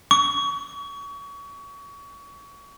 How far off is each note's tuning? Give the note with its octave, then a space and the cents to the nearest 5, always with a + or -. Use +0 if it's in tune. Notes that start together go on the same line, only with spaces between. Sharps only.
C#6 +30